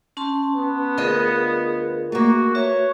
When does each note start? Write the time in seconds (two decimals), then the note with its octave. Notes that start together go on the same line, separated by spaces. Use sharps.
0.17 C#4 A5 C6
0.56 B3
0.98 D2 F4 G#4 A#4 D#5
2.12 A3 A#3 F#4
2.55 F#4 B4 C#5 E5